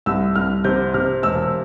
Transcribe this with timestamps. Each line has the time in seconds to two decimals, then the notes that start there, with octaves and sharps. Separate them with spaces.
0.06 C2 E6
0.35 C2 F6
0.64 C3 G6
0.94 C3 F6
1.23 E1 E6